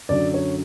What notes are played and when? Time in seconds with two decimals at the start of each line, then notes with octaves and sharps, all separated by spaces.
0.09 F#2 D3 F#3 D5
0.34 C#5